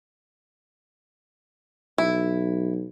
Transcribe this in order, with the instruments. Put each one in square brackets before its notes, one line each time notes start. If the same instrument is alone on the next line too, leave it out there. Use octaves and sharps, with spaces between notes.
[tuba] B1 [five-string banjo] E4